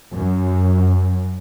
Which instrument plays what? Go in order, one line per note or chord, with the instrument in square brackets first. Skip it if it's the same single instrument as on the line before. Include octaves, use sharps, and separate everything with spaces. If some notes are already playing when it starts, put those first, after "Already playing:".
[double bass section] F#2